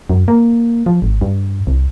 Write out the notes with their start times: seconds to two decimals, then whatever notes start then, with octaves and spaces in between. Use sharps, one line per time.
0.09 F#2
0.28 A#3
0.86 F3
1.02 G#1
1.21 G2
1.67 C2